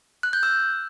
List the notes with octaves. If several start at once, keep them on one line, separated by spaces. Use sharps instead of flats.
F#6
G6
E6